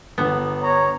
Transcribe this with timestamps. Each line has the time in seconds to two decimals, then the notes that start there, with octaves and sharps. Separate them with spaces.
0.18 G1 B3
0.63 C#5 A#5